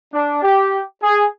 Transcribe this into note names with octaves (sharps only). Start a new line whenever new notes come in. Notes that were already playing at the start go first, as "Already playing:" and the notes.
D4
G4
G#4